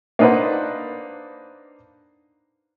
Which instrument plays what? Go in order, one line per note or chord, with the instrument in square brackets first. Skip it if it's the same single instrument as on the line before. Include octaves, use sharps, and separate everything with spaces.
[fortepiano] A#3 D4 D#4 B4 C5 F#5